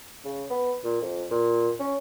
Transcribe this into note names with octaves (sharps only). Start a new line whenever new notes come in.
C#3
B3
A#2
F2
A#2
C#4